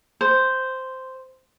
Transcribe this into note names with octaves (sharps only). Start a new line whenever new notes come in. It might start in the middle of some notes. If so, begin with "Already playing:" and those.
C5